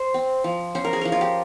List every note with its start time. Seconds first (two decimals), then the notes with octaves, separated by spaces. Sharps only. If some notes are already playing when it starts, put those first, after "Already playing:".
Already playing: C5
0.14 C4
0.44 F3
0.75 C#4 C5
0.84 A#4
0.93 G#4
1.01 F3 A#4
1.12 F4
1.21 G4